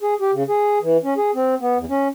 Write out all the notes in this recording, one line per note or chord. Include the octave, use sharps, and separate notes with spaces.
G#4
G4
C#3
G#4
E3
C#4
G#4
C4
B3
E2
C#4